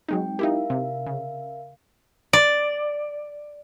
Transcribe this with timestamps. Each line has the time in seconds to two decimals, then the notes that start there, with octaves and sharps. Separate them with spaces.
0.08 F#3 G#3 C4 D#4 G5
0.39 D#4 E4 G4 A#4 E5 F5
0.70 C3
1.07 C#3
2.33 D5